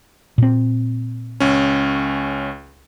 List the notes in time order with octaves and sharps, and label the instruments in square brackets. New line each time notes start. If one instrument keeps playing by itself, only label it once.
[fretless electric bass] A#2 C4
[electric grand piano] C#2 C#4